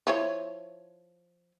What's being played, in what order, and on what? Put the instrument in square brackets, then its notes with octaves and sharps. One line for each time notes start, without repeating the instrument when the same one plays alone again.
[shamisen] F3 E4 C#5